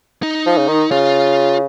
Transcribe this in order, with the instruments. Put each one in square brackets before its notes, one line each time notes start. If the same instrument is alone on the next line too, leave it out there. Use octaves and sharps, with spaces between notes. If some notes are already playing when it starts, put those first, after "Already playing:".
[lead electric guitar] D#4
[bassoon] F3
C#3
D#3
[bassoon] C#3 [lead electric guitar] F4